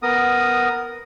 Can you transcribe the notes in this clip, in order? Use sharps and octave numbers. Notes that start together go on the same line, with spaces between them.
B3 A#4 D#6